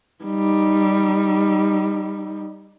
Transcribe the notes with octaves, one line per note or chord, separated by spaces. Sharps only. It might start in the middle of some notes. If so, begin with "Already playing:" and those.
G3 D#4